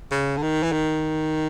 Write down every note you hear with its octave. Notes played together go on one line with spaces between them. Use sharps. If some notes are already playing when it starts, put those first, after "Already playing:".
C#3
D3
D#3
E3
D#3